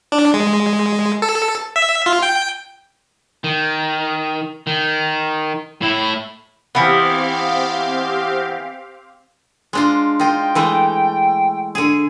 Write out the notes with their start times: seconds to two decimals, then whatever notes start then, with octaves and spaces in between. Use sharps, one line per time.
0.12 D4
0.34 G#3
1.22 A4
1.76 E5
2.06 F4
2.22 G5
3.44 D#3
4.67 D#3
5.81 A2 E4
6.75 E3 B3 C4 G4 F5
9.73 G#3 D4 F4
10.20 D#4 F4 G5
10.55 E3 G#3 A3
11.75 D3 G#4